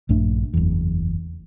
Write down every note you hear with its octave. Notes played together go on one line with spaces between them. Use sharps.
A#1 G2 A3 D4
F#1 E2